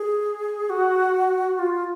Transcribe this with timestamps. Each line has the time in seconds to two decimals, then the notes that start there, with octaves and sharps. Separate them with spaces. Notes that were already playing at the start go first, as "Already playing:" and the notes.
Already playing: G#4
0.70 F#4
1.59 F4